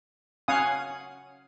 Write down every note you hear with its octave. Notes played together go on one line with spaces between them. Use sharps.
C#4 F5 F#5 G#5 D#6